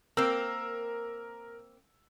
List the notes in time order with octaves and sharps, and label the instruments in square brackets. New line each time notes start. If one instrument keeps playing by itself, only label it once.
[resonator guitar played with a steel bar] A#3 C4 [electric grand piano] A#4 E6